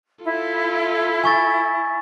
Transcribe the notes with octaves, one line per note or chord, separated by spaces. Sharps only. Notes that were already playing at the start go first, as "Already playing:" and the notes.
E4 F4 A4
G#5 C#6 A6